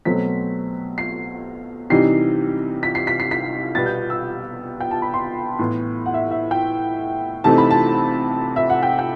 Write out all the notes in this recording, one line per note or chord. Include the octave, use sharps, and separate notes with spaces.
B2 F#3 A3 C4 B6
C7
C3 E3 G3 D#4 C7
B6
C7
B6
C7
B6
B2 G3 B3 A6
G6
E6
G5
A5
B5
C6
A2 E3 B3
F#5
E5
E5
G5
C3 E3 A3 C4 D#4 A5
B5
A5
E5
F#5
G5
G5